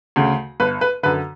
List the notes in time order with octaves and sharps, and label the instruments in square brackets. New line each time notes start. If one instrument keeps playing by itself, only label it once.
[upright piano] D2 C#3
G1 B4
B4
F#2 D3 B4